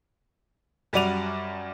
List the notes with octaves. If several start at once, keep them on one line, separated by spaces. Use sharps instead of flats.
F#2 G3 F#4 D5 D#7 F7